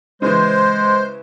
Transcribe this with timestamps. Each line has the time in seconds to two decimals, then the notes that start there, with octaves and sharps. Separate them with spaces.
0.22 C#3 E3 G#3 C5